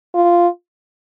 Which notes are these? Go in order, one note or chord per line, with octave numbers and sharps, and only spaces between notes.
F4